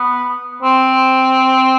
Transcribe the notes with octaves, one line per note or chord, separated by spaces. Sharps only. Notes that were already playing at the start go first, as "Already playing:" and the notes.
Already playing: B3
C4